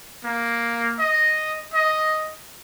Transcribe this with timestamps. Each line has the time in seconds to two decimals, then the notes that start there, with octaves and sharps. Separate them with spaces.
0.24 A#3
0.99 D#5
1.74 D#5